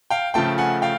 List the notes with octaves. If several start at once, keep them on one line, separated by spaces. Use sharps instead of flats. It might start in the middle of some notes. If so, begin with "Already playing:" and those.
F5 G5
C#3 F3 A3 G5 A5
F#5 G#5
F5 G5